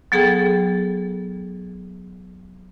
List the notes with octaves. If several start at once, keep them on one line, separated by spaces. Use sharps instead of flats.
F#3 B3 G#4 A4 G5